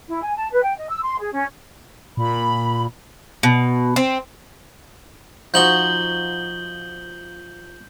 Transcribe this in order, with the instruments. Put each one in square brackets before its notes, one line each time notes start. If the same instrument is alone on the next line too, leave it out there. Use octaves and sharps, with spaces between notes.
[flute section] E4
G#5
A5
B4
G5
D#5
E6
C6
G#4
C#4
[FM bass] A#2 [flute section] B5
[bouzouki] B2
C4
[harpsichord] F3 D#4 F#4 [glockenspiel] G6 F#7 G7